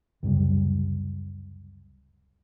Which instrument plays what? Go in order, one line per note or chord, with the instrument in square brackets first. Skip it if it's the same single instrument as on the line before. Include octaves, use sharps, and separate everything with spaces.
[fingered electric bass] C#2 F#2 C3 G3